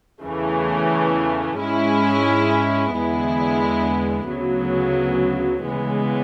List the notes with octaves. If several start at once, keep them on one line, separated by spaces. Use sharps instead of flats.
E2 C#3 E3 A3
G#2 G#3 C#4 E4
E2 D3 G#3 B3 E4
D2 C#3 F#3 B3
C#3 E3 G#3 B3